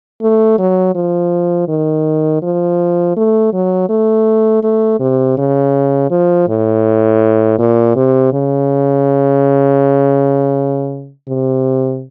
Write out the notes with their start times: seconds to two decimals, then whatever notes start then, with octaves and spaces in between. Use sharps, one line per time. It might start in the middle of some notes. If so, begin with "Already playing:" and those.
0.22 A3
0.59 F#3
0.95 F3
1.68 D#3
2.43 F3
3.16 A3
3.53 F#3
3.90 A3
4.63 A3
5.00 C3
5.38 C#3
6.11 F3
6.48 A2
7.59 A#2
7.96 C3
8.33 C#3
11.28 C3